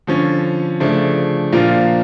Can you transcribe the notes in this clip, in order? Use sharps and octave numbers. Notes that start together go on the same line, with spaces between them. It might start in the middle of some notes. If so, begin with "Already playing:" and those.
D3 F3 C#4
C#3 F3 A3 D4
A#2 F3 A#3 D4 F4